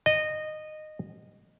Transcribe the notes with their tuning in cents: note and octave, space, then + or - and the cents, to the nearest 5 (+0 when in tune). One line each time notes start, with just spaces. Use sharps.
D#5 -15